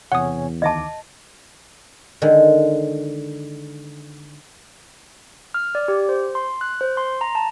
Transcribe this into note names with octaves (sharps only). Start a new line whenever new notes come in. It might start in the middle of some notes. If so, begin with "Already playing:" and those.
E2 C3 C#5 F#5 G#5 D#6
D2 D#3 D#5 E5 A5 D6
D3 D#3 G#3
F6
D5
G4
C5
C6
F#6
C5
C6
A#5
A5